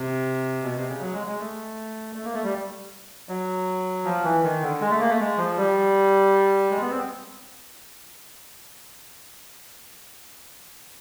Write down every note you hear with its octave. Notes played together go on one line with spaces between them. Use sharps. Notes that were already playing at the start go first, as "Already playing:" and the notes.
Already playing: C3
B2
C3
C#3
F#3
G#3
G#3
A3
A3
A#3
A3
G3
F#3
F3
E3
D#3
D3
G#3
A3
A#3
A3
G#3
F3
G3
G#3
B3
C4